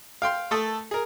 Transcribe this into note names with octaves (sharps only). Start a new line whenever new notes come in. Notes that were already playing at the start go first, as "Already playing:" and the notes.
F5 G5 C6
A3 A4 D#6
G#4 A#4